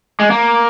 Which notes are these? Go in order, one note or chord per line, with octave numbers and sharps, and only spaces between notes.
G#3
A#3